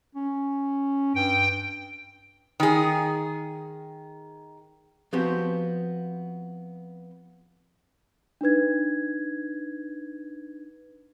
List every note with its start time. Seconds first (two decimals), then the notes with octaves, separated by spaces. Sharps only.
0.15 C#4
1.15 G2 G5
2.60 D#3 G#4
5.13 F3 B3 C4 F#4 G4
8.41 D4 D#4 B4 G#6